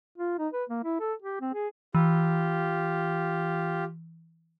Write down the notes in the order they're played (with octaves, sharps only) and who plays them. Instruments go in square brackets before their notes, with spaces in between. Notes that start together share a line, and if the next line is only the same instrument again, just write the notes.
[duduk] F4
D#4
B4
A#3
E4
A4
G4
C4
G#4
[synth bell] E3 [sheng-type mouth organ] F4 G4